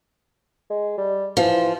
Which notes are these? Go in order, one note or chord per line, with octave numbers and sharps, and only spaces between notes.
G#3
G3
E3 F3